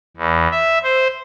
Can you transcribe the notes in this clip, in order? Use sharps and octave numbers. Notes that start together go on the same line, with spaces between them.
E2
E5
C5